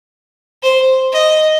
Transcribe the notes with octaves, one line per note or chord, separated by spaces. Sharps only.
C5
D#5